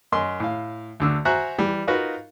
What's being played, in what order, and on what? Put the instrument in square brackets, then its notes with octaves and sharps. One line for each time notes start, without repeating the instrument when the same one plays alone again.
[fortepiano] F#2 D#5 C6
A2 F5
D2 D3 E6
F#4 C5 E5 G#5 A#5 F#6
E3 G3
D#4 F4 F#4 A#4 B4 F5